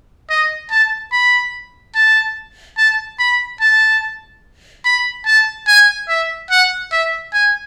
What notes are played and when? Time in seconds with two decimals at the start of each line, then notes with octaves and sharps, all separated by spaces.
0.30 D#5
0.71 A5
1.12 B5
1.95 A5
2.78 A5
3.19 B5
3.61 A5
4.85 B5
5.26 A5
5.67 G#5
6.09 E5
6.50 F#5
6.92 E5
7.33 G#5